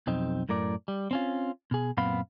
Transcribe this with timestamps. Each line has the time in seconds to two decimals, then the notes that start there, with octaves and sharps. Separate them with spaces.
0.07 B1 F2 C4 D#4
0.49 F#2 A2 A#4 D5
0.88 G3
1.11 C4 C#4 F4
1.71 B2 G#4
1.97 F#2 A#2 B3 C4 F5 B5